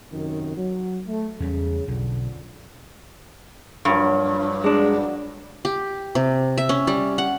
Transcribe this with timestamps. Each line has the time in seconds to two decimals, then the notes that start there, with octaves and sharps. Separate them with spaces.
0.12 F#2 C3 D#3
0.56 F#3
1.07 A3
1.40 E2 C#3 G3
1.88 B1 F2 D3
3.85 G2 F3 F#3 A#3
4.64 G#3 D4 D5
5.65 G4
6.15 C3
6.58 E5
6.69 C#4
6.87 G3
7.18 F#5